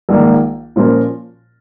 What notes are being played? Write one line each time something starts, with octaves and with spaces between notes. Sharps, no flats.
A#1 G#2 D#3 A#3
A#2 F3 C#4 F4 A#4